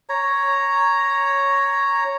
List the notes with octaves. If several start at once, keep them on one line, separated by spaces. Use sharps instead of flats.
C#5 A#5